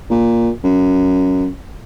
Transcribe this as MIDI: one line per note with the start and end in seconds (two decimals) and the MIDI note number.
0.10 0.50 46
0.64 1.47 42